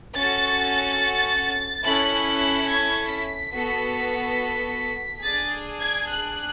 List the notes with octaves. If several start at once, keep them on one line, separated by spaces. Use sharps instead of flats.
C#4 F#4 A4 A6
C#4 E4 A4 F#6
F#6
G#6
B6
B3 F#4 A4
D4 G#4 A6
G#6
F#6